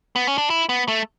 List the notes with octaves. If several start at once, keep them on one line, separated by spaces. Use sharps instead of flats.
B3
C#4
D4
E4
B3
A3